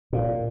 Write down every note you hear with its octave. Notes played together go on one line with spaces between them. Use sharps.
A#2